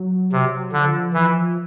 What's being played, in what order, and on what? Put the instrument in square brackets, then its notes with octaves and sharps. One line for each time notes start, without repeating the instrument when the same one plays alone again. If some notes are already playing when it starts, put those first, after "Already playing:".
Already playing: [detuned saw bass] F#3
[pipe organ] C3
[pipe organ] D3 [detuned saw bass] F3
[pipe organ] E3